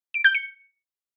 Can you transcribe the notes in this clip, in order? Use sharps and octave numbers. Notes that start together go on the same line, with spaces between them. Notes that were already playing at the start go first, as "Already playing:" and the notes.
D7
G6
C#7